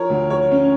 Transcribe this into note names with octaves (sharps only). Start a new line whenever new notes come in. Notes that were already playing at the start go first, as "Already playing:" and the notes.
Already playing: F3 A#4 C#5
D2
C#5
C#4